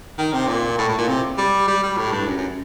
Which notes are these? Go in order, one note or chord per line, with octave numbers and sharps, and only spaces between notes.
D#3
C3
A#2
A2
A2
A#2
C3
G3
G3
G3
A2
G2
F#2
F#2